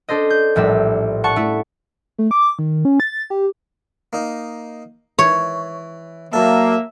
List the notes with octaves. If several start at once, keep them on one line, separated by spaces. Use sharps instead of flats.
D4 A4 C5 D#5
G6
A#1 A2 G3 E5 E6
F#5 A5 C#6
A3 E4
A3
D6
D#3
C#4
A6
G4
A#3 D#4
E3 C#5
F#3 A#3 A4 E5